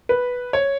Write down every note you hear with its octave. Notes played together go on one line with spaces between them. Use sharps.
B4
C#5